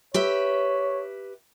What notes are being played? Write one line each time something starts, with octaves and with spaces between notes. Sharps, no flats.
G4 B4 C#5 E5